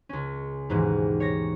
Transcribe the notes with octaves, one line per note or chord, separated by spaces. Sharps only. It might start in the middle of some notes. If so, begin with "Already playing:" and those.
C#2 C#4
D#2 G#2 B2 E3
C#5 A#6